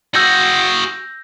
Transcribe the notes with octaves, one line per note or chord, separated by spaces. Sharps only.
F#4 G#4 E6 G6 A#6